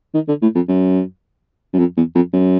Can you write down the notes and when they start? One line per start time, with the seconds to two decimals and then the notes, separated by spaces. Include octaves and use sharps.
0.14 D#3
0.28 D3
0.42 A2
0.55 F2
0.69 F#2
1.73 F#2
1.79 F2
1.97 E2
2.15 F2
2.33 F#2